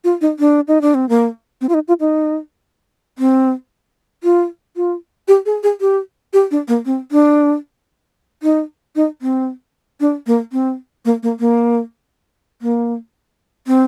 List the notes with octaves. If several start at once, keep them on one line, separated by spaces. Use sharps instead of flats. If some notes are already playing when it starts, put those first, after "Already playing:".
F4
D#4
D4
D#4
D4
C4
A#3
C4
F4
D#4
F4
D#4
C4
F4
F4
G4
G#4
G#4
G4
G4
D4
A#3
C4
D4
D#4
D#4
C4
D4
A#3
C4
A#3
A#3
A#3
A#3
C4